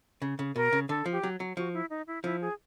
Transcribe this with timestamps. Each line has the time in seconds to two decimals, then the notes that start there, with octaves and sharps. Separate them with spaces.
0.22 C#3
0.39 C#3
0.56 B2 A#4
0.73 C#3
0.89 D3 A4
1.06 F3
1.12 G4
1.23 F#3
1.40 F#3
1.57 F3 F#4
1.74 E4
1.90 D#4
2.07 E4
2.24 F3 E4
2.41 G#4